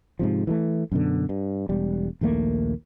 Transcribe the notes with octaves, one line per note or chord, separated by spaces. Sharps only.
G#2 C3 F3
E3 G#3 A3
F#2 B2 D3
G2
E1 G3
A#1 D#2 A3 A#3